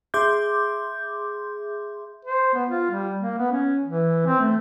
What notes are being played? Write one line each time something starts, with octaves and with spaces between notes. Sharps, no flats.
G#4 E5 C6 D6 G6
C5
B3
F4
G3
A#3
B3
C#4
E3
C4
A3